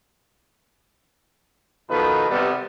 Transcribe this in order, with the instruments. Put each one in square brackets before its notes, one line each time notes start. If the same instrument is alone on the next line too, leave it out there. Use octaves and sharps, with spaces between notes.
[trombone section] B2 D#3 F3 A4 B4
C3 G3 B3